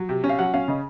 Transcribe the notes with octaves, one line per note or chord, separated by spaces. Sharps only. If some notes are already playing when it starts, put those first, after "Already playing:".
Already playing: F#3
C3
C#4
F5
F#3 F#5
C#4 F5
C#3 D#5